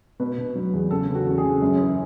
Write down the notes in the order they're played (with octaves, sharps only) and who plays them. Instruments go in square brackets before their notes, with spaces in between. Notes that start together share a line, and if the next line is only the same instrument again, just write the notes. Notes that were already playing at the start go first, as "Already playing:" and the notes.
[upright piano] B2 B4
B2
F#3
E2
C#3 A4
C#3
F#4
E2
G#4
C#3
F#2
E3